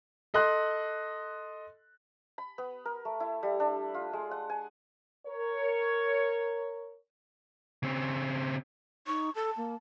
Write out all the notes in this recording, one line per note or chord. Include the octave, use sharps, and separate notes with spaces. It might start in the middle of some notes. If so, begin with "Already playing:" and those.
A4 D#5 C6 F#6
B5
B3
A#4
A3
E4
G3
D4
F4
G#3
F#5
G#5
A#4 C#5
C#3 C4
D#4 C#6
A4 A5
A#3